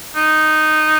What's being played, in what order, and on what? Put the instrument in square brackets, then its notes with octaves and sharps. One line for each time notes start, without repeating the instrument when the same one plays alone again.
[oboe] D#4